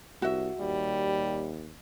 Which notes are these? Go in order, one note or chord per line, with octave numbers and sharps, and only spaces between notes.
C2 F#4 E5
D#2 G3